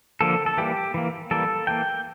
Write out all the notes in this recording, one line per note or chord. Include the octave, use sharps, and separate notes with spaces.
D3 F3 A#3 A4
A4
E3 G3 A#3 G4
E3 A#3
E3 G3 A#3 A4
E3 A#3 G5